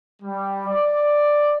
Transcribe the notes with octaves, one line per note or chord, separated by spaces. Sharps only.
G3
D5